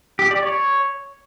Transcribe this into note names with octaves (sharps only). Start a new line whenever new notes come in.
G4
D5
C#5